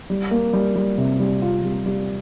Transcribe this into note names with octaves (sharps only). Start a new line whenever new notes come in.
G3
A#3
G3
G3
C3
G3
F4
G3
G3